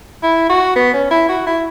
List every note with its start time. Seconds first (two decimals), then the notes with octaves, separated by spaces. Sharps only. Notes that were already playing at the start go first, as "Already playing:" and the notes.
0.23 E4
0.49 F#4
0.76 B3
0.93 C#4
1.11 E4
1.29 F#4
1.47 E4